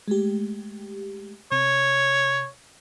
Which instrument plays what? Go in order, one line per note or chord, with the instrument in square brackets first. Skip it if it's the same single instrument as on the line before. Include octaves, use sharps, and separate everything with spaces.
[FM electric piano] G#3 A3 G4
[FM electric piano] C3 [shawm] C#5